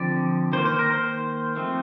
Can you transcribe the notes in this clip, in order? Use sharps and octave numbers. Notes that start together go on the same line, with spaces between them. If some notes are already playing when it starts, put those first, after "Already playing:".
Already playing: D3 F3 C4 D5
D#3 A#3 C5
C5
A#4
C5
F3 A3 C4